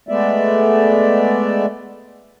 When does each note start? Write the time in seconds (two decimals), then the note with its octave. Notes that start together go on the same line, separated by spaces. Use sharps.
0.09 G#3 A3 B3 D5 E5